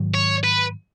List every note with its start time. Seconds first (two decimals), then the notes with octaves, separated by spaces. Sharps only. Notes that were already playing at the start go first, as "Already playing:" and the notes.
Already playing: G#2 D#3 F#3
0.14 C#5
0.44 B4